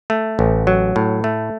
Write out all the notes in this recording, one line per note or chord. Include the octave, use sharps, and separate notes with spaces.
A3
A1
F#3
A2
A3